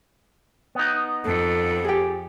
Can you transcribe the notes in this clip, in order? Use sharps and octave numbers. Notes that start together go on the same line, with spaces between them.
B3 D#4
F2 F3 A4
G4 G#4